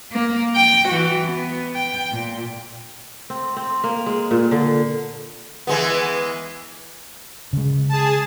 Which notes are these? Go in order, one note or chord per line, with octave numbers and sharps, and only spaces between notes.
A#3
G5
E3 F#4
B3
G5
A#2
C4
C4
A#3
G#3
A#2
D3
E3 G#3 B3
C#3 G#3
G#4 A5